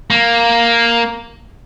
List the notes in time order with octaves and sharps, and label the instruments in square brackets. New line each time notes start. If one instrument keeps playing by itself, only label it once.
[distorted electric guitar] A#3